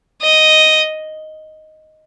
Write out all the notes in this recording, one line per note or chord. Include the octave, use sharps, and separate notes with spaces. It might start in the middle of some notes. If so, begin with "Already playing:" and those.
D#5